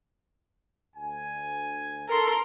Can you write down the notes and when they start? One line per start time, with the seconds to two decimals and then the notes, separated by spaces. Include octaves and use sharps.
0.95 D2 G#5
2.08 A4 A#4 C6